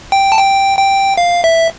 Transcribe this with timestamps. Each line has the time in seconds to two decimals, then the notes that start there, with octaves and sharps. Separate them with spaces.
0.12 G5
0.32 A5
0.39 G5
0.78 G5
1.18 F5
1.44 E5